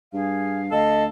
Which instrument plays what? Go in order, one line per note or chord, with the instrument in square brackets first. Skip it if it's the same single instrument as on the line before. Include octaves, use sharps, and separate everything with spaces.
[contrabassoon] G2 [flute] G#4 [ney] F5
[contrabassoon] D2 [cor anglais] A4 [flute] D#5